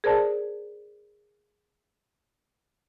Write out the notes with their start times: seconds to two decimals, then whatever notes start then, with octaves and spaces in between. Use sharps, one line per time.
0.04 G#4 A#4 C5 D5 A5